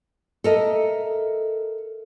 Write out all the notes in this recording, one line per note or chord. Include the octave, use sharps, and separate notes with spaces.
A4 A#4 D#5 E5